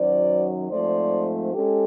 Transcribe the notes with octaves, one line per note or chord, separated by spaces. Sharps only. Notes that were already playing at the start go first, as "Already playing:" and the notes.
Already playing: F#2 D#3 F#3 C5 D5
G#2 F3 A3 C4 C5 D5
G#3 C#4 G4 A4